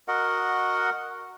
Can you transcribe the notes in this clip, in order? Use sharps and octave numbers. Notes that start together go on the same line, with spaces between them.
F#4 A#4 D#5 F#5